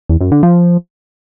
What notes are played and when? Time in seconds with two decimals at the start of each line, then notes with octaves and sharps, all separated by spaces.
0.09 E2
0.21 F#2
0.32 D3
0.43 F3